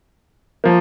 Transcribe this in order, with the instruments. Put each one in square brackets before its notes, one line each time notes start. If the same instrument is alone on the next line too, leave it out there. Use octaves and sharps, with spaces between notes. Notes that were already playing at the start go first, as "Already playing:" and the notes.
[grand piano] F3 A#3